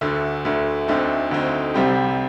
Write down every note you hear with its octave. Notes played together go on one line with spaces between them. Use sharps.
D2 D3 A3
D2 D3 A3
D2 D3 A3 C4 D#4
D2 D3 A3 C4 D#4
C2 C3 G3 C4 G4